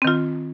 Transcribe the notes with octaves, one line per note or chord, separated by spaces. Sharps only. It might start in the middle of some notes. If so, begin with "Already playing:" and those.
D#3 C4 F4